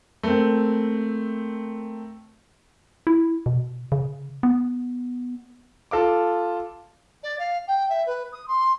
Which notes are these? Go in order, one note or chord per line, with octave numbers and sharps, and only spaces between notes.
A3 A#3 C4
E4
B2
C#3
B3
F4 A4 F5 D6
D5
F5
G5
E5
B4
D#6
C6